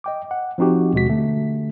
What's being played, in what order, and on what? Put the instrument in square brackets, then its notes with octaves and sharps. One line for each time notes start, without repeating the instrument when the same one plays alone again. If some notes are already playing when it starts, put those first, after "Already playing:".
[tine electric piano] D#5 G5 D6
F#5
F3 C4 D#4 F#4 G4
D#2 B2 G#3 F#4 B6
D3 A3